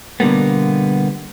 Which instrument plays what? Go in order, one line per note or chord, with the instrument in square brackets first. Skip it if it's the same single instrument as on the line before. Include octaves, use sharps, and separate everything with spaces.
[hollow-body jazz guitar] B2 D3 G3 A#3 B3